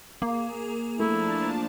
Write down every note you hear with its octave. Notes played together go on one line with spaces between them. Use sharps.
A#3 G#4
F3 A3 D4 E4 A5